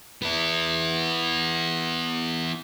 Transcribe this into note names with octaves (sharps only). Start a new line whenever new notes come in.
B3 E4